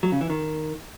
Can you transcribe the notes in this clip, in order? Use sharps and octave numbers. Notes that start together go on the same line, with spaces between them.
F#3
C#3
E3
D#3